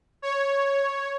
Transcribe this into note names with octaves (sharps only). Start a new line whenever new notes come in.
C#5